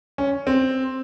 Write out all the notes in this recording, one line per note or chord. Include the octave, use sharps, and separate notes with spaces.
C#4
C4